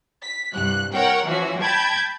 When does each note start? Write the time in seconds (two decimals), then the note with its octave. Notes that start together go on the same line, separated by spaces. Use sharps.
0.24 B6
0.54 C2 G2 F#6
0.94 A#4 C#5 F#5 G5
1.28 E3 F3 C#4 F#4
1.62 G5 A5 B5 G6 G#6